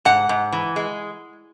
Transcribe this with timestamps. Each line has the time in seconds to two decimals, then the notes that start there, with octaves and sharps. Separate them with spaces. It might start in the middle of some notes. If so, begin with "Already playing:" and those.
0.05 G#2 F#5
0.29 G#2
0.53 E3
0.76 G#3